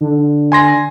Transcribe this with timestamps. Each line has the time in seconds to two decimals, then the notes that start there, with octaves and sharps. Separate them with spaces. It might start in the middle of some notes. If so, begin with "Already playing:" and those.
0.01 D3
0.52 G#5 C6 A#6